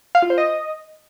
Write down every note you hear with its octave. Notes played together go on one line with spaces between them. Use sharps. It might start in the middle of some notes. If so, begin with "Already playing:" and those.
F5
F4
C5
D#5